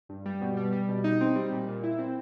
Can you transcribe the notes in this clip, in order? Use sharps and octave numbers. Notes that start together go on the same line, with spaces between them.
G2
G3
B2
G3
G3
B2
D#4
C4
G3
A#2
A#2
E4
C4